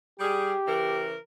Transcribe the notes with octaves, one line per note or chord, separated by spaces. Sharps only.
G3 G4 G#4
C#3 E3 A#4